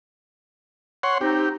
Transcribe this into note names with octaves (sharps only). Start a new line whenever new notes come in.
C#5 F#5 C6
C4 D#4 G4